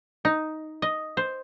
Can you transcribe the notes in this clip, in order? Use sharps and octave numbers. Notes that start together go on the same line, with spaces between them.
D#4
D#5
C5